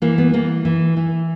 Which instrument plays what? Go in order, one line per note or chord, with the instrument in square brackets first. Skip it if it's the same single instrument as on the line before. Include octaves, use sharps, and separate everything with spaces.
[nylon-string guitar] E3 A#3
B3
E3 A#3
E3
E3